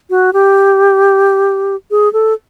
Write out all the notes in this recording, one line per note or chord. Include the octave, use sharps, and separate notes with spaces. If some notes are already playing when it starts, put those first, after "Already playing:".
F#4
G4
G#4
A4